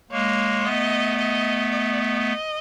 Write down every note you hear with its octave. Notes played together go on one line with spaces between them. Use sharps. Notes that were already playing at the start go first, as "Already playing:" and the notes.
G#3 A#3 C#5
A3 B3 D#5
D#5
D#5